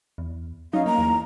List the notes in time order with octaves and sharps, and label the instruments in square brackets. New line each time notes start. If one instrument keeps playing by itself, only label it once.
[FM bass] E2
[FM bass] F#3 [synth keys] C#4 D#4 [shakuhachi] F5
[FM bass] A#3 [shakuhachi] A#5
[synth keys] E2